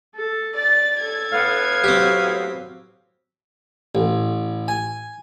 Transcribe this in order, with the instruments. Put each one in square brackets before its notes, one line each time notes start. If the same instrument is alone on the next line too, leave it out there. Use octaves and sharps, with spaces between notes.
[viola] A4
[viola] D5 [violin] A6
[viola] A4 [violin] G#6
[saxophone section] A2 B3 F5
[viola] F#3 [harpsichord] C4 G4
[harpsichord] A1
G#5